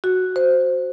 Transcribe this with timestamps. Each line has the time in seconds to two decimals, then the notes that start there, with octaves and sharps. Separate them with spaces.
0.04 F#4
0.36 C5